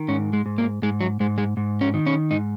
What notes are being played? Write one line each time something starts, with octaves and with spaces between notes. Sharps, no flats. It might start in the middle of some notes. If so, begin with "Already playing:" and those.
Already playing: D#3
G#2 C#4
G#3
G#2
A#3
G#2 G#3
F#3
G#2 G#3
G#3
G#2
C#4
D#3
C#4
G#2 D#4